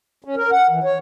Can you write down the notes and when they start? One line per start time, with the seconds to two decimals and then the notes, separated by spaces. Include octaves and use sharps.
0.25 C#4
0.36 A#4
0.52 F#5
0.70 E3
0.84 C#5